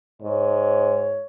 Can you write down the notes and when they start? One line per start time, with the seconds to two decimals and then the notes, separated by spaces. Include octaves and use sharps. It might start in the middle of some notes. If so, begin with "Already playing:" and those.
0.22 G#2 C#5